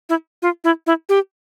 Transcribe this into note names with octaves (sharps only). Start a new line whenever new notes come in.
E4
F4
E4
E4
G4